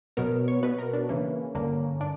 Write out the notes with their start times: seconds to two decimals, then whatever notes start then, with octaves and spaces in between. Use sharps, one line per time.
0.17 B2 F#3 B3 A#4
0.48 C#5
0.63 B2 F#3 B3 B4
0.78 A#4
0.93 D4
1.09 C#3 E3 A#3 C#4
1.55 G2 D3 A#3
2.01 D4